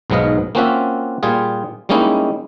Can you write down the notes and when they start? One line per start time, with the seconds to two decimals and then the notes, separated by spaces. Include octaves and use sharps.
0.10 B1 G#2 F#3 B3 D#5 F5
0.55 A#3 C4 C#4 F4 F#4 E5
1.23 A#2 G3 F4 G#4
1.89 G3 G#3 A#3 C#4 D#4 E4